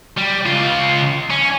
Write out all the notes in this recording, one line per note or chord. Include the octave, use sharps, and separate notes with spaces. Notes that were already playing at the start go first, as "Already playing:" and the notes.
G3
C#2 F4
C#4